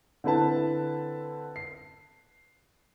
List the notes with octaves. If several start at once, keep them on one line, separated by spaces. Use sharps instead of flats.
D3 C4 E4 B4 A5
C7